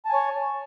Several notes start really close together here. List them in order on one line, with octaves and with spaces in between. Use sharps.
A5 G#5 C#5